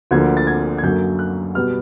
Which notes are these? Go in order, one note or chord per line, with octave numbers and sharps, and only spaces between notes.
D2 D3 F3 A#3 G#6
A6
G#6
G#6
F#2 D3 F#3 A#3 G6
F#6
B2 G3 B3 F6